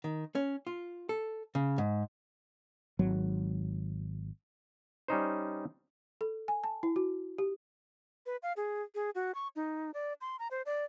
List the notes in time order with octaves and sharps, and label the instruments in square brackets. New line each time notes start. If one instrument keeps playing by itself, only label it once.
[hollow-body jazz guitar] D#3
C#4
F4
A4
C#3
G#2
[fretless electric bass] G#1 F#3
[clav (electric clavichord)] G3 C#4 D#4 C5
[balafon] A4
G#5
A5
E4
F#4
G4
[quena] B4
F5
G#4
G#4
F#4
C#6
D#4
D5
C6
A#5
C5
D5